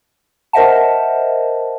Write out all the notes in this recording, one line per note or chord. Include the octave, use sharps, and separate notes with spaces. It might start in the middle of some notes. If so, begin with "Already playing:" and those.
A#4 C5 D#5 E5 F#5 A5